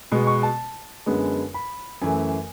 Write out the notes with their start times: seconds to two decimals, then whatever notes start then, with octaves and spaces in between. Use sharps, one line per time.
0.12 B2 G#3 B3
0.27 C#6
0.43 A5
1.06 F#2 D3 G#3 B3
1.54 B5
2.02 F#2 E3 A3 G#5